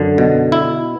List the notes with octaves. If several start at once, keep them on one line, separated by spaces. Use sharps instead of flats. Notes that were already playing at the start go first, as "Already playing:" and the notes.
Already playing: F#2 D3
B2
E4